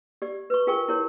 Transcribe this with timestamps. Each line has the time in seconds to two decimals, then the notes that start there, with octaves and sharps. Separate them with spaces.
0.22 G4 D5
0.50 B4 C#6
0.67 F4 G#4 A#4 G5 G#5 C#6
0.88 E4 G4 A#4 C#5